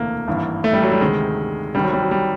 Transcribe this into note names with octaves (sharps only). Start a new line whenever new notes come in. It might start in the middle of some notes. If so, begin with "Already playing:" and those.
Already playing: E1 D2 C3 E3 A3 A#3
G#1 G2 E3
A3
G3
F#3
G3
D2 C3 D#3 G#3
C2 C3 D#3 G3
F#3
G3
F#3
G3